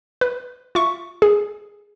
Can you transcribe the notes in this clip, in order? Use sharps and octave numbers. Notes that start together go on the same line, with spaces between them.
B4
F4 E5 C#6
G#4